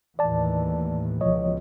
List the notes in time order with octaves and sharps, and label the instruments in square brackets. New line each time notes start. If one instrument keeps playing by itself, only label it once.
[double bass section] D#2 A2 E3 [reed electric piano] D5 A5
[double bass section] C#2 B2 [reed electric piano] F3 C#5 D#5